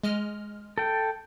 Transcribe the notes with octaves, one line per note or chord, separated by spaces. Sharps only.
G#3 D#5 F6
A4 G5